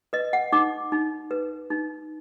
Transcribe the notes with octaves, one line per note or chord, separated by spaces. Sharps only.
B4 D#5
F#5
D#4 D6
D#4
B4
D#4